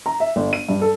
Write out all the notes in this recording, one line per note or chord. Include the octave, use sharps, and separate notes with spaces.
A#5
E5
G1
D#7
G2
A4